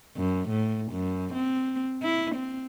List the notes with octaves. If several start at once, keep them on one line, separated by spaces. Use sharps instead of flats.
F#2
A2
F#2
C4
E4
C4